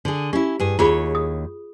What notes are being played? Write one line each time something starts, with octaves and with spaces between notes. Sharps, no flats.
D3 G#4
C#4 E4 G4
G2 G#4
D#2 F4 G#4 C#5 B5
D#6